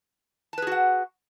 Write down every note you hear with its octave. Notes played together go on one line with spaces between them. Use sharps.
F#4 G#4 B4 F#5 A5